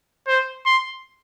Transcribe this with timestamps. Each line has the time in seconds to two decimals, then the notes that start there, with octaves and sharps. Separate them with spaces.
0.27 C5
0.66 C6